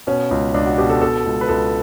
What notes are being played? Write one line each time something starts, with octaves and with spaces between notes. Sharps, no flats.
B2 C#4
C#2
C#2 D4
F#4
B2 G4
A4
B2 A4
C#2
B4
C#2 A4